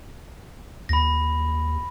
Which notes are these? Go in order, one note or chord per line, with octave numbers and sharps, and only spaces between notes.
D#2 B5 A#6